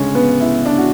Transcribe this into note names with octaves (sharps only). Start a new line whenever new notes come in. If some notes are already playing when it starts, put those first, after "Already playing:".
Already playing: D2 C#3 G#3 C#4 C#5
B3 B4
E4
D4
F#4